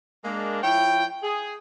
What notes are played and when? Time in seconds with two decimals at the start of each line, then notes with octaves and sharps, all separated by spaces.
0.25 G#3 A#3 D4
0.63 F3 E4 C#5 G5
1.23 G#4